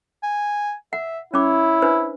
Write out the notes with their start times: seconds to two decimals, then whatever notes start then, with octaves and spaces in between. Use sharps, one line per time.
0.23 G#5
0.93 E5 F#5
1.34 C#4 E4 C#5 D6
1.82 D4 B4 C5